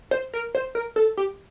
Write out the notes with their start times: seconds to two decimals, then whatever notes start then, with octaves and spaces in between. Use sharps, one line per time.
0.11 C5
0.34 A#4
0.55 C5
0.75 A#4
0.96 A4
1.17 G4